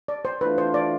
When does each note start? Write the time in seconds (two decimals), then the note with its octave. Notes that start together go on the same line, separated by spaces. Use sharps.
0.08 D5
0.25 C5
0.41 E3 A3 D4 F4 B4
0.58 C5
0.74 D5